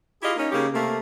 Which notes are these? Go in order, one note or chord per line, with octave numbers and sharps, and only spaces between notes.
E4 F4 G4 G#4 D#5
A#3 C#4 D#4
C#3 A#3 C#4 G4 G#4
C3 A3 A#3